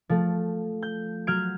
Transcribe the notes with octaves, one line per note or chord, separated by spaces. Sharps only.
F3 A3
G6
F#3 F6 G6 G#6 D7